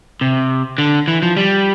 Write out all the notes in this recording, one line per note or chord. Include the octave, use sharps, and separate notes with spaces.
C3
D3
E3
F3
G3